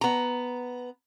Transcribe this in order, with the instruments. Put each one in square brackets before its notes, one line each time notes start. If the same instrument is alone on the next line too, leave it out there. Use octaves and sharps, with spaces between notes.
[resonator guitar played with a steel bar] B3 A#5